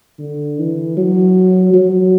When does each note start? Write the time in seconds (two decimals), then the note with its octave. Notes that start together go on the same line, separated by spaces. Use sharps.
0.19 D3
0.59 E3
0.97 F#3
1.74 F#3